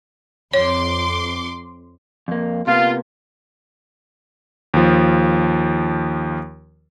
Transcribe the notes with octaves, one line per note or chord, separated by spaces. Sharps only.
F2 C#5 C6 D6
F2 A#3
C3 A#3 B3 F4
D#2 F3